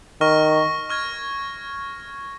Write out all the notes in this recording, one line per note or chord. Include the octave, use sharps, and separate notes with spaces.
D#3 C#6 F6 A#6
C#6 F6 G#6